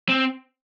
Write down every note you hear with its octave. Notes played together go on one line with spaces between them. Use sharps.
C4